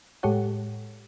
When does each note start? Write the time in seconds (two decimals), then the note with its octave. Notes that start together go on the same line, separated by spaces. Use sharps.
0.23 A2 G#3 G4 A4 C#5 F#5